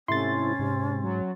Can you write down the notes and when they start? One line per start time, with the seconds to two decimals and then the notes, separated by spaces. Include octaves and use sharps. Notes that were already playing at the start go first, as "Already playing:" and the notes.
0.08 G#2 C3 A3 C#4 E4 C6 A6
0.59 G#2 C3
1.03 F#3